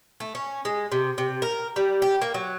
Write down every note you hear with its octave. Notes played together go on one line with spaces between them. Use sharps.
A3
C#4
G#3
C3
C3
A#4
G3
G4
A#3
F#3